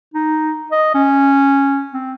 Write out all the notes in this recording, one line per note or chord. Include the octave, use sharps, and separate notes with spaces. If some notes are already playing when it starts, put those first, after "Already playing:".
D#4
D#5
C#4
C4